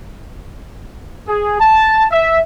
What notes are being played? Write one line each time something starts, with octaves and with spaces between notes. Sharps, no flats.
G#4
A5
E5